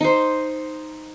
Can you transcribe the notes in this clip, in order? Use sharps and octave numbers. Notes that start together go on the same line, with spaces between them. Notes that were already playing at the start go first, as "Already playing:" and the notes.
D#4 C5